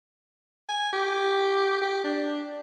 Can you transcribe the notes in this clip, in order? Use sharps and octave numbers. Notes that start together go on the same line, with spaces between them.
G#5
G4
G4
D4